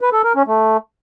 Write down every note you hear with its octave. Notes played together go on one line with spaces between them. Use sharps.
B4
A4
A#4
C#4
A3